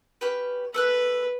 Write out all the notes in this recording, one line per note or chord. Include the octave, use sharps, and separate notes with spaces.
C#4 G4 B4
A4 B4 B5 F#6